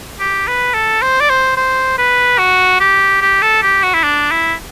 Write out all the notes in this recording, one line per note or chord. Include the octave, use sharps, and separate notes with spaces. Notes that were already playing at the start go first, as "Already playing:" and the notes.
G4
B4
A4
C5
D5
C5
C5
B4
F#4
G4
G4
A4
G4
F#4
E4
D4
E4